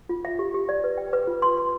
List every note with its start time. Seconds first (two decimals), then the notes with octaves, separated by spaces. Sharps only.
0.09 F4
0.25 E5
0.39 G4
0.54 G4
0.69 D5
0.84 B4
0.98 G5
1.13 B4
1.27 F4
1.42 C6
1.57 C6